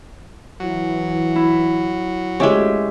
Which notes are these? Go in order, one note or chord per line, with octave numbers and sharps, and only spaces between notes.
E3 F#3
E4
G#3 A3 C#4 F#4 G4 E5